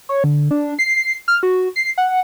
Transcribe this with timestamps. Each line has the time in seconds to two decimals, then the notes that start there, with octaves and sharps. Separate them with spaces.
0.09 C#5
0.24 D3
0.51 D4
0.79 C7
1.28 F6
1.43 F#4
1.76 C7
1.98 F#5